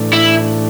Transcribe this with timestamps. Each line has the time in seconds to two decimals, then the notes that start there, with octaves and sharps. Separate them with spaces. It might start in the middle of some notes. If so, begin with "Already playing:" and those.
Already playing: A2 E3 A3 D4
0.13 E4